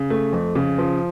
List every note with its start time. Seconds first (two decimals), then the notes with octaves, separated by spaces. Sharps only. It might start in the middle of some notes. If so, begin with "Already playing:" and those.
Already playing: C#3
0.10 A3
0.33 F2
0.55 C#3
0.78 F3